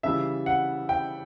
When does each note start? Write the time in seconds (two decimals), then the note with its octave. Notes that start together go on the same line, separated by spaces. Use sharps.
0.03 C#3 E3 G3 E5
0.46 F#5
0.89 G5